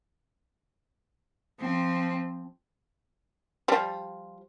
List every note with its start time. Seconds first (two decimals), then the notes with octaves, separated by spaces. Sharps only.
1.60 F3 C4
3.68 F3 G3